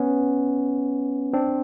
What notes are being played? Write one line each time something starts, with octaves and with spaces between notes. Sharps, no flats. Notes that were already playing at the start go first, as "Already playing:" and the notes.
Already playing: B3 C#4
C4 D4